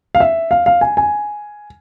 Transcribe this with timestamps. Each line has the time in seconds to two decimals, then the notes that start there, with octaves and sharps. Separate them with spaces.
0.15 F5
0.20 E5
0.51 F5
0.66 F5
0.81 G#5
0.97 G#5